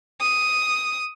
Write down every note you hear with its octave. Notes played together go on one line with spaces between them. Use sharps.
D#6